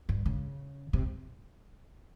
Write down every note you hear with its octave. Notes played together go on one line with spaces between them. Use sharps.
G2
C#3
C3